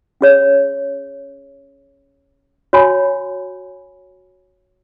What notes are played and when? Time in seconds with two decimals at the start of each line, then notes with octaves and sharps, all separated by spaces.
0.21 C#4 G#4 C#5
2.73 F#4 C#5 G#5 B5